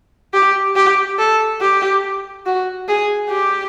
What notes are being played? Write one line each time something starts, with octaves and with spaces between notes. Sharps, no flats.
G4
G4
A4
G4
F#4
G#4
G4